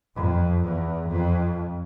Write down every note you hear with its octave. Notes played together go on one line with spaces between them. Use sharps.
F2
E2
F2